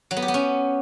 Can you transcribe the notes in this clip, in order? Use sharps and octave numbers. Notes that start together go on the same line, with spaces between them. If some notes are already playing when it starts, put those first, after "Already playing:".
F#3
B3
G4
B3
C#4